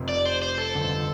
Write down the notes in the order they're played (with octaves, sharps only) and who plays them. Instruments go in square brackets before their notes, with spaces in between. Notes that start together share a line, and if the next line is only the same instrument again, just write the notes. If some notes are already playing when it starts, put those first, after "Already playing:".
Already playing: [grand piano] F1 F2 C3
[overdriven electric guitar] D5
C5
C5
A4
[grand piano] G1 F2 D3 F3